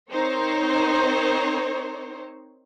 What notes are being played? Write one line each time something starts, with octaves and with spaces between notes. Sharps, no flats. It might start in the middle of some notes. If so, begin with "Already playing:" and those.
C4 D#4 A#4 C5 C#5